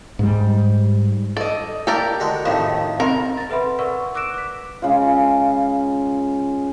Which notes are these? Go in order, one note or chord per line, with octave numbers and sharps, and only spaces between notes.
G#2 G3
A4 D5 D#5
G4 A4 A#4 D5
D3 G#3 F#4
F2 A2 D#3 A3 F5
C3 C4 A#4
A6 A#6
A4 B4 E5 F#5 B5 C6
A#4 B4 D5 F#5 C#6 E6
D6 E6 F#6 A#6 D7 E7
D6 B6
C#3 G#3 F4